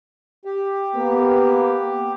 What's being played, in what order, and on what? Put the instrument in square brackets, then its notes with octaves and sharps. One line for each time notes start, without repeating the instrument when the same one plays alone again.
[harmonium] G4
[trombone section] A#3 B3